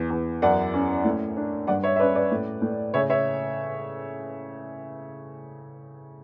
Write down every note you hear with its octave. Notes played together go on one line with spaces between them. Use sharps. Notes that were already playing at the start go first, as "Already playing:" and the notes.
Already playing: E2
E2
F#2 D5 F#5
C#4
A2
D4
G2 D5 F#5
C#5 E5
E5
C#4 B4 D5
B4 D5
A2
A2
C#3 C#5 E5
C#5 E5